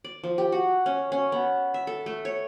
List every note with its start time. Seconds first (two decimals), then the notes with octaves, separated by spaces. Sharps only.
0.04 D5
0.23 F3
0.38 G4
0.52 F#4
0.86 C#4
1.12 C#4
1.32 B3
1.74 E5
1.87 A4
2.06 A3
2.25 C#5